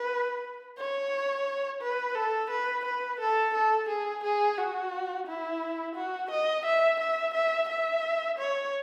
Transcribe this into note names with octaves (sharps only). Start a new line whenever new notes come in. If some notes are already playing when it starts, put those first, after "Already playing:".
Already playing: B4
C#5
B4
A4
B4
B4
A4
A4
G#4
G#4
F#4
E4
F#4
D#5
E5
E5
E5
E5
C#5